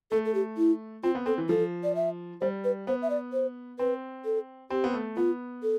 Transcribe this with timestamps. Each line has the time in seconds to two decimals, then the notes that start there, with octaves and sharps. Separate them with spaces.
0.11 A3 A4
0.25 A4
0.35 G4
0.57 E4
1.03 C4 F4
1.15 B3
1.26 C4 A4
1.38 E3
1.49 F3 A4
1.84 D5
1.95 E5
2.41 G3 C5
2.64 B4
2.87 B3 C5
3.02 E5
3.10 D5
3.33 C5
3.79 C4 B4
4.25 A4
4.70 C4 G4
4.84 B3
4.94 A3
5.17 B3 F4
5.63 A4